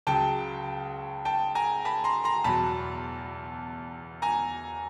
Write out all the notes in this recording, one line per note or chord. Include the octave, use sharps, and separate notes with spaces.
C#2 C#3 F#3 G5 A5
G5 A5
G#5 A#5
A5 B5
A#5 C6
A#5 C6
E2 B2 F#3 A5 B5
G#5 A#5